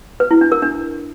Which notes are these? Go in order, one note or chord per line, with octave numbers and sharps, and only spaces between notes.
B4
E4
D4
A#4
D4